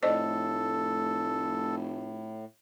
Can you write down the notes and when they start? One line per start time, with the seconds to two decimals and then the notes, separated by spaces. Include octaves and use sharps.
0.03 F1 A2 A4 C5 D5 D#5